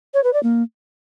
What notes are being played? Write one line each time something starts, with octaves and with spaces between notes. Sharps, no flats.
C#5
B4
D5
A#3